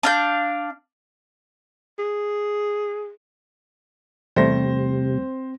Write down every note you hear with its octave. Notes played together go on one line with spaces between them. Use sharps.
D4 F5 G6
G#4
E2 C3 G3 A3 C4 C5 A#6